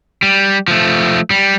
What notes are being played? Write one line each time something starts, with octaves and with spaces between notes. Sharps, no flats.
G3
F3 A3
G3